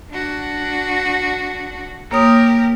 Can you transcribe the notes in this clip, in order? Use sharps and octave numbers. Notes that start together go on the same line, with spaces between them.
D4 F#4
A#3 G4 A#4 C#5 D#6